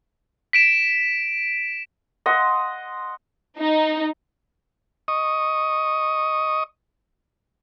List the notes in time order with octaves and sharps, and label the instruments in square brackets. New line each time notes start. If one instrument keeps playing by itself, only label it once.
[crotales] B6 D7 E7
[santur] D#5 F#5 C6
[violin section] D#4
[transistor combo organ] D#5 C#6 D#6